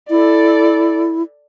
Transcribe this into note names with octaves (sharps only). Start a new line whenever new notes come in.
E4 A4 D5